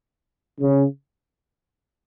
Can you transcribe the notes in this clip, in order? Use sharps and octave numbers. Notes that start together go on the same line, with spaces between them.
C#3